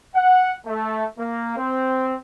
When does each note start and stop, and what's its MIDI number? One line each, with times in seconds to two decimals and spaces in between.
0.16 0.53 78
0.66 1.06 57
1.17 1.53 58
1.56 2.15 60